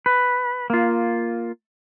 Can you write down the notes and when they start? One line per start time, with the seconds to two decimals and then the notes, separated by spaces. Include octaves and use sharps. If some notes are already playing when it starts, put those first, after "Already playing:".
0.06 B4
0.70 A#3 F4